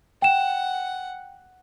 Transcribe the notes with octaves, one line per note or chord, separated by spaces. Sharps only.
F#5 G5 E7